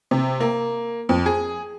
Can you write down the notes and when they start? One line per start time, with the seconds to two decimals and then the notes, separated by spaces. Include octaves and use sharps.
0.11 C3
0.40 A#3
1.09 F2
1.26 G#4